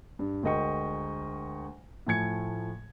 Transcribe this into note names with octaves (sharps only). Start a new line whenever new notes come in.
G2
D2 G#3 A#4 D#5 G5 C#6
A2 F3 A3 G#5 G#6 C#7